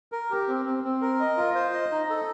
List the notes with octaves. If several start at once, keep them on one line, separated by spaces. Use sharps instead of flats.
A#4
G4
C4
C4
C4
A#4
D#5
F4
C5
D#5
D#4
A4